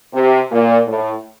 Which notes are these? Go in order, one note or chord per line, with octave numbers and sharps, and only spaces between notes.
C3
A#2
A2